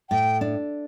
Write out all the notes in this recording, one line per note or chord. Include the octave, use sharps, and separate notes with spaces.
A2 G5
D4